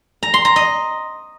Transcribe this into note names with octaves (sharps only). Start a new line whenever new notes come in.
A#5
C6
A#5
D#5